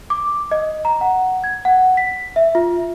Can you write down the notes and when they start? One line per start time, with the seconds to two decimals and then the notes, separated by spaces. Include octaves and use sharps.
0.10 D6
0.51 D#5
0.85 A#5
1.01 F#5
1.44 G#6
1.65 F#5
1.97 B6
2.36 E5
2.55 F4